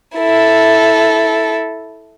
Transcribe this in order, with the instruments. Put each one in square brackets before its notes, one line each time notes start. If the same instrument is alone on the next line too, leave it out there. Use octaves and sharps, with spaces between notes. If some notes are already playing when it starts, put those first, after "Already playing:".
[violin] E4 A4